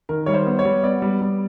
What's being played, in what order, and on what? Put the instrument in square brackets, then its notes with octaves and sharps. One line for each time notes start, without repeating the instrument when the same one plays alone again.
[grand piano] D#3 A#4
G3 C#5
C5
B3
C#5
G3
B3 D5
G3
G3